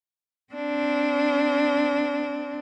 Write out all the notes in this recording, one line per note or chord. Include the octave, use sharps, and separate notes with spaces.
C4 D4